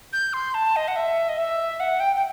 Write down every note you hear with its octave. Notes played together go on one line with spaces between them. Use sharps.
G6
C6
A5
D#5
F#5
E5
D#5
E5
F#5
G5
G5